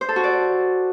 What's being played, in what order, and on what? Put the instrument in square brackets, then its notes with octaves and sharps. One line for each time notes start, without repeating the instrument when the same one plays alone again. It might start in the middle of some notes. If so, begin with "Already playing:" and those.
[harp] C5
A4
F#4
D5